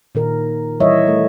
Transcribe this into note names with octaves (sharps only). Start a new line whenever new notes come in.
A#2 D#3 A#4
E3 G3 C#5 D#5 E5
A3